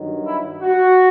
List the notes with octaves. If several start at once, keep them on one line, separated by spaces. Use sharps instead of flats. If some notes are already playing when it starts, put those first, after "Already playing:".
Already playing: G2 D#3 F#3
E4
F#4